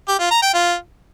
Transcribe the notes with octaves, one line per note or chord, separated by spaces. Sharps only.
G4
F4
A#5
G5
F4